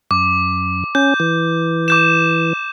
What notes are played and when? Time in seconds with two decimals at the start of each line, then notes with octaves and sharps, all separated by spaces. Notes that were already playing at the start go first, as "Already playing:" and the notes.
0.11 F#2 D6
0.95 C#4 G6
1.20 E3
1.88 D6 G6 E7